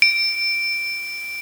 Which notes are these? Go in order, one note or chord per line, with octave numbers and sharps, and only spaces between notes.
D7